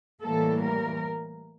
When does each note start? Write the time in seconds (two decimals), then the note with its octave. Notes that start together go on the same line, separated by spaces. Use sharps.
0.23 A2 E3 G3 A#3 A4
0.64 A#4